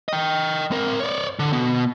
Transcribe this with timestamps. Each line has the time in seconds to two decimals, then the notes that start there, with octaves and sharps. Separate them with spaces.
0.08 D#5 G5
0.71 C4 A#4
1.00 C#5 D5
1.39 D3
1.53 B2